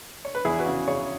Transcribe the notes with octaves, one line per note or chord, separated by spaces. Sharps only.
C#5
B4
E2 E4 G#4
F#4 B4
C#3
C#3 G#4 C#5